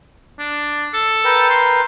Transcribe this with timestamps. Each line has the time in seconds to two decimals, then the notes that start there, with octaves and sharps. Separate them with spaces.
0.39 D4
0.94 A4
1.25 A#4 B4 G5
1.50 C6